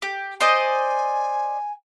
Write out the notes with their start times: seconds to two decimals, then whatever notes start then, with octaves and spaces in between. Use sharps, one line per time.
0.02 G4
0.41 C5 D5 D#5 G#5